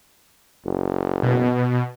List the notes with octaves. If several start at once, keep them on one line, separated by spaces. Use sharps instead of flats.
F#1
B2